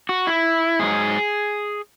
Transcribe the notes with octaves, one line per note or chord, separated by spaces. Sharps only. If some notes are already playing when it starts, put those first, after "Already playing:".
F#4
E4
G#2 F#3 G#4